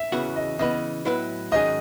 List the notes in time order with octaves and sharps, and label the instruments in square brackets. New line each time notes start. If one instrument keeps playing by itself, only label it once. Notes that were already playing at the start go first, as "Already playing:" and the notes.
Already playing: [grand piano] E5
[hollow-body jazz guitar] E2 C#3 E3 B3 F#4
[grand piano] D#5
[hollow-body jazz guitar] C#3 E3 B3 [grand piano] D#5
[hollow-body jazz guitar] A2 F#3 B3 E4 B4
[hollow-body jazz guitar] G#2 D#3 F#3 C#4 G#4 [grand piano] D#5